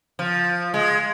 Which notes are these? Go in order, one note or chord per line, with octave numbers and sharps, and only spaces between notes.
F3
G#3